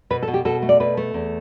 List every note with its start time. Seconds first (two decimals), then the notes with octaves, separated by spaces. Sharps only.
0.10 B2 B4
0.23 A4
0.28 B2
0.34 G4
0.45 B2 A4
0.62 A3
0.69 D5
0.80 B2 B4
0.97 A3
1.14 E2